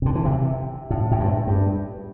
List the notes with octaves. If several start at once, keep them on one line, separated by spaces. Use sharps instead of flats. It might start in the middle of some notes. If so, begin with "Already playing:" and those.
C3
D3
E3
C3
A2
A2
G2
G2